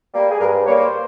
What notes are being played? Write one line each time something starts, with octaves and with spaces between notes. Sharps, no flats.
G3 A#3
G#4
G2 A#4
C5
G3 A#3 C#5
C5